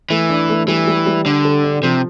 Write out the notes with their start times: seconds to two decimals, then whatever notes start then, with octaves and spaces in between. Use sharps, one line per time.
0.10 E3 A3
0.30 D4
0.49 A3
0.68 E3 G3
0.87 G3
1.06 G3
1.25 D3 D4
1.45 A4
1.64 D4
1.83 C3 F3